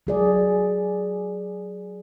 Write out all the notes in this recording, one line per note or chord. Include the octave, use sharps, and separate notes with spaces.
F#3 G#4 D5